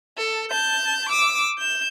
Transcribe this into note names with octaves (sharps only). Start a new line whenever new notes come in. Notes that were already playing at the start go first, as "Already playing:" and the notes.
A4
A5 G6
D6 E6
G6 E7